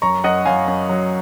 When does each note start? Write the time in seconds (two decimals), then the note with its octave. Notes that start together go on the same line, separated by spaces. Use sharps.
0.02 F#2 A#5 C#6
0.24 F#2 D#5 F#5
0.45 F#2 F5 G#5
0.68 F#2
0.89 F#3